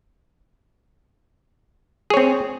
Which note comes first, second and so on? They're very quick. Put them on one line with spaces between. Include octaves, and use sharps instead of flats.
G#4 C#5 C4